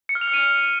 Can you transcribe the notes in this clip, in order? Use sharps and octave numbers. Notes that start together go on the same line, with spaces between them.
C#7
F6
F7
F6
D#7